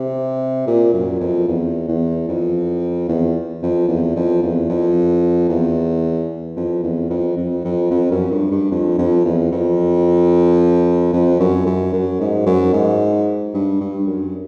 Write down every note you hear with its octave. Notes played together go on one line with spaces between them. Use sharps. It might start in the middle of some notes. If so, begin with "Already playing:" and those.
Already playing: C3
A#2
F#2
F2
E2
E2
F2
E2
F2
E2
F2
E2
F2
E2
F2
E2
F2
F2
F2
F2
F#2
G2
G2
F2
F2
E2
F2
F2
F#2
F#2
F#2
G#2
F#2
G#2
G2
G2
F#2